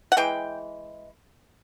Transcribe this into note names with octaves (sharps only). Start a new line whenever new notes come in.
F#5
E3 G#3 G5